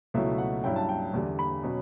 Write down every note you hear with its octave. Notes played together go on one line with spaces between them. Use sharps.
C#2 B2 F#3 A3 E4 E5
F#5
G2 F#3 C#4 E4 G5
A5
G5
E2 D3 G3
B5
B2 F#3 C#4